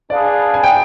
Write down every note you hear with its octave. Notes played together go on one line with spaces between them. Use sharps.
D4 G#4 B4 D5 F5
G#5
G5